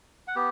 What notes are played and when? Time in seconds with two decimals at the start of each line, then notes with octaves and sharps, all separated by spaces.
0.28 F#5
0.36 B3 G4